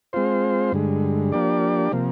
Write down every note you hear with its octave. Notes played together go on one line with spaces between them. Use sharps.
G#3 C4 F4 C5
G2 D3 G#3
F3 A#3 D4 G4 D5
C3 F3 A#3